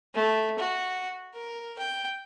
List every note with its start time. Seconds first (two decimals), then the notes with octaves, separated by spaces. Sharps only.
0.15 A3
0.59 F#4
1.34 A#4
1.78 G5